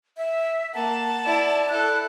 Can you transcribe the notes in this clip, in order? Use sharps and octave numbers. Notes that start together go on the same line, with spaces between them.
E5
A#3 F#5 A5
E4 D5
E4 A4 F#6